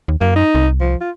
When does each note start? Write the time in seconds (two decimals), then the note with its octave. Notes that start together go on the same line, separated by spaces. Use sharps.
0.08 D#2
0.21 F#2 A#3
0.36 D#4
0.55 C2
0.80 F3
1.01 F4